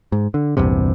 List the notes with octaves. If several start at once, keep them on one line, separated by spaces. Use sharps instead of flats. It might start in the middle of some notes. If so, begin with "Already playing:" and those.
G#2
D3
A#1 E2 G2 C3